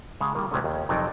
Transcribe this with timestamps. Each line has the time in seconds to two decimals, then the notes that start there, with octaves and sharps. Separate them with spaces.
0.21 C#3 G#3 F5 F#5 A5
0.35 D#3 G3 A#3
0.51 D2 C3 E3 G#3 A3 C#4
0.64 D#2
0.89 F2 C3 F#3 D#4 A#4 D5